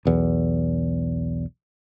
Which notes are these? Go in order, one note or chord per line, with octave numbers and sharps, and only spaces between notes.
B1 E2